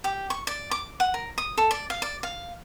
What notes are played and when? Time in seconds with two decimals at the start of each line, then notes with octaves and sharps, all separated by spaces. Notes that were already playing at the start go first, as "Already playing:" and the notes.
0.04 G4
0.30 C#6
0.47 D5
0.71 D6
1.00 F#5
1.14 A#4
1.38 D#6
1.58 A4
1.71 D5
1.90 F5
2.02 D5
2.23 F5